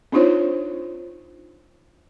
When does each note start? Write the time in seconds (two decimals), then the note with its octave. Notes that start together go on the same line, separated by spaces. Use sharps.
0.12 C4 D4 D#4 F4 C5 C#5